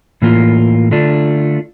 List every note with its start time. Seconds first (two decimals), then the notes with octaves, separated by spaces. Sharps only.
0.22 A2 E3 A#3 F4
0.91 D3 A3 D4 F4